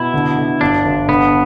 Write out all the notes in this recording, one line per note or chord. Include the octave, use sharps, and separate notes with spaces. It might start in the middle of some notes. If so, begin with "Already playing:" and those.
Already playing: B2 E4
D3
D3
G1 D4
G1
D3 B3